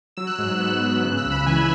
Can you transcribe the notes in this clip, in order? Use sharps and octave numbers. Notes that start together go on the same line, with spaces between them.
F#3 E6
F#6
G#2 E6
F#6
B3 E6
F#6
G#2 E6
C#3 F#6
E6
C#2
B5
E3 G#5